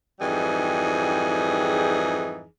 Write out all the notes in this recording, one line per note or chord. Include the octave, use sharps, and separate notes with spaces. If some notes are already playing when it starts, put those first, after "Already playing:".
F2 G#2 E3 G3 D#4 G#4